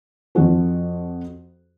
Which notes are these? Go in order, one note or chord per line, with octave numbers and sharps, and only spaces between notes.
F2 F3 F4 F#4 A4